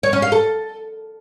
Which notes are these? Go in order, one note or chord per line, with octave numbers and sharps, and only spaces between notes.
C#5
C#4
F5
A4